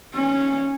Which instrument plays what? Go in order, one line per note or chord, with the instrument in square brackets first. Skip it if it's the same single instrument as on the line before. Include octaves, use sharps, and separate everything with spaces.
[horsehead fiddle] C#4